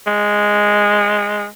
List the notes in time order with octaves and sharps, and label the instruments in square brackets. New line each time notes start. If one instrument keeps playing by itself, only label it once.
[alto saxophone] G#3